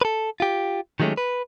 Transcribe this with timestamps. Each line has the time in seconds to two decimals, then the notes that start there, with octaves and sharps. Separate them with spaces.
0.01 A4 B4
0.40 F4 G4
1.00 D#3 F#3 G#3 A3 C#4 G4
1.17 B4